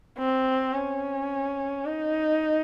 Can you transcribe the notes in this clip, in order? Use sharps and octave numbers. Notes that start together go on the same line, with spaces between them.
C4
C#4
D#4